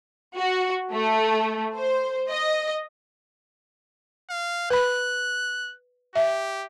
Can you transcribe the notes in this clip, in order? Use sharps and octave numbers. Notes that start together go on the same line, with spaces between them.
F#4
A3
C5
D#5
F5
B4 B5 F#6
G4 E5